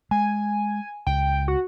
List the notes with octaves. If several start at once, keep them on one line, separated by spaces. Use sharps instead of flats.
G#3 G#5
C#2 G5
F#4